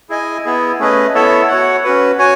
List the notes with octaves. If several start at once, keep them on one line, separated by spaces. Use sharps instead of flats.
E4 G#4 D#5 G#5
B3 E4 G#4
A3 C#4 G#4 B4 D#5
B3 E4 A4 C#5 E5
F#4 C#5 F#5
C#4 F#4 B4
F#4 C#5 G#5